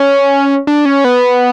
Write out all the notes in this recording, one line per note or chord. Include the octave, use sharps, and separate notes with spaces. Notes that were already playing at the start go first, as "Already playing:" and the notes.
Already playing: C#4
D4
C#4
B3